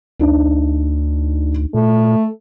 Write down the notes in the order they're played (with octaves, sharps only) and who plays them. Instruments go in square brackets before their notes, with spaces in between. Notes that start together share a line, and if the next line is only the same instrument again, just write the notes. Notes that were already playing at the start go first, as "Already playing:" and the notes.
[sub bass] D2 [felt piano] D4 D#4
[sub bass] A#2 [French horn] A3